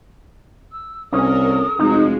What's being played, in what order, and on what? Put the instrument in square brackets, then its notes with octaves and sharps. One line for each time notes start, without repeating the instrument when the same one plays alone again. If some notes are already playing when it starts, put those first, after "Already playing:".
[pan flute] E6
[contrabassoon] C2 [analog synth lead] C#4 [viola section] A4 A#4 [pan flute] D#6
[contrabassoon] F1 [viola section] F3 G#3 F#4 [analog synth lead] D#4